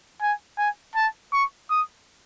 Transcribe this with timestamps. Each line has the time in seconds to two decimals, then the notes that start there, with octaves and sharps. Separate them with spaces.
0.22 G#5
0.58 G#5
0.96 A5
1.33 C#6
1.70 D#6